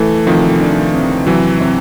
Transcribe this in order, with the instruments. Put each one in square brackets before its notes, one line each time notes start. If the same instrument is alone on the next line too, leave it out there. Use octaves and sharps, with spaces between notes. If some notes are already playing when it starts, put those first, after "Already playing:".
Already playing: [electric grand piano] E3 [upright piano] A3
[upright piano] C3 [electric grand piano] D#3 F3
[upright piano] D4
C3
[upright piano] C3 [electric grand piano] E3 F#3
[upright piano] C3